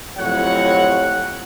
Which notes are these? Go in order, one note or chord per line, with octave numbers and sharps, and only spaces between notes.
F2 A2 F#3 G4 C#5 F#5